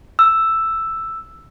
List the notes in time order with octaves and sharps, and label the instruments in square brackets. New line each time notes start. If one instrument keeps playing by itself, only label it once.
[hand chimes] E6